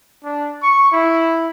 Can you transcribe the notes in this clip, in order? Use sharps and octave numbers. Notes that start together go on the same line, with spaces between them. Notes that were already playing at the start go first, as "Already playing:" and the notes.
D4
C#6
E4